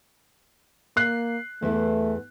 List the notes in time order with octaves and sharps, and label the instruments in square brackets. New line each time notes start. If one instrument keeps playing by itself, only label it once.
[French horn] A#3 [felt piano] F#6 C7
[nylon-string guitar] E2 E3 [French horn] A3